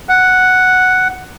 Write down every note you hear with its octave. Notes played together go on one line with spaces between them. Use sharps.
F#5